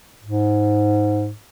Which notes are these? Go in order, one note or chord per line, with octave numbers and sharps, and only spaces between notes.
G#2